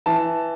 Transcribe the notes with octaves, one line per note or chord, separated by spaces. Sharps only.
E3 A5